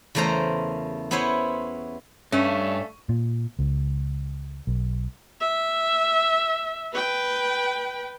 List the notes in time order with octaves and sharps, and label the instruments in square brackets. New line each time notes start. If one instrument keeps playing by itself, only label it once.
[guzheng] E2 C#3 A3 A#4 C5 A#5
B3 C#4 E4 C5 C#5
[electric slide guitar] G2 [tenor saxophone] A3 [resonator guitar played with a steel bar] C#4
[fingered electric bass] A#2
C#2
B1
[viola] E5
B4 G5